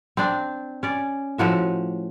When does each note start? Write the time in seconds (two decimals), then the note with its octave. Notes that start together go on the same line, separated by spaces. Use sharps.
0.17 C4 D4
0.83 C#4 D5
1.38 A2 F3 F#4 E5